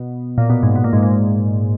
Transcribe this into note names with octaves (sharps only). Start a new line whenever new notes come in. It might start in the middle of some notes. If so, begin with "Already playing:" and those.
Already playing: B2
A#2
B2
G#2
B2
A#2
G#2
A#2